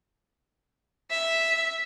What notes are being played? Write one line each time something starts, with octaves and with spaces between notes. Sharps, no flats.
E5